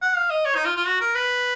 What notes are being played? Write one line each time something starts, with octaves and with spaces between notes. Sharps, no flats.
F#5
F5
D#5
C#5
D#4
F4
F4
F#4
A#4
B4